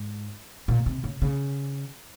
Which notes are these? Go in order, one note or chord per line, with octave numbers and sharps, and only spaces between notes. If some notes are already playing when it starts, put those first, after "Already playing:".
Already playing: G#2
A#2
C3
C#3
C#3